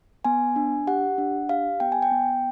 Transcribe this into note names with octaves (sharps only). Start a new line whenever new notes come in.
B3 G#5
D4
G4 F#5
D4
G4 F5
B3 G5
G#5
G5
B3